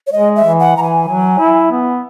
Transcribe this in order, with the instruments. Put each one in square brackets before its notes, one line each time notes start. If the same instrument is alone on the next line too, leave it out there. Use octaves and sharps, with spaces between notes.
[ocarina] C#5
[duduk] G#3 [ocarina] D#5
[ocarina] E5
[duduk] E3
[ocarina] F#5
[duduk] E3 [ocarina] A#5
[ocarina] G#5
[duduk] F#3
E4
B3